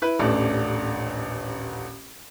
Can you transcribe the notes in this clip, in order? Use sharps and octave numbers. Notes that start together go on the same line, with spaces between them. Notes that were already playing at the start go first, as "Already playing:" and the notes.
E4 B4
D#1 A1 A3 D4